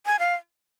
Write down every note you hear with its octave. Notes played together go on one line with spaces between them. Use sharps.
G#5
F5